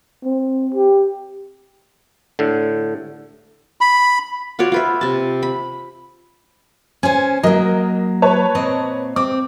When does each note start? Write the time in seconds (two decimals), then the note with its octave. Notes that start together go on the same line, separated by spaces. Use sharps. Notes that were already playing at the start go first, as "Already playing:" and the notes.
0.23 C4
0.74 G4
2.39 A2 D3
3.81 B5
4.59 F4 F#4 C#5 D5
4.72 F4 B4 E5
5.01 C3 A5
5.43 B5
7.03 C#4 C5 G#5
7.43 F#3 A#3 A#4 D#5
8.22 B4 C#5 A5
8.55 A#2 C4 D#5
9.16 C4 D6